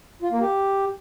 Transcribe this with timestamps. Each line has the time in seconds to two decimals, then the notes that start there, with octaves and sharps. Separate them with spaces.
0.22 F4
0.31 A#3
0.41 G4